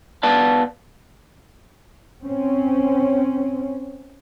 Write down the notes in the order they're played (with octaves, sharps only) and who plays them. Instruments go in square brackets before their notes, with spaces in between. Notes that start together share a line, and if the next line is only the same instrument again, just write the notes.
[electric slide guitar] B3 B4 D5 F5 A5
[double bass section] C4 C#4